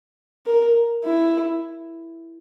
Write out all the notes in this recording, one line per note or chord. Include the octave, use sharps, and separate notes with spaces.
A#4
E4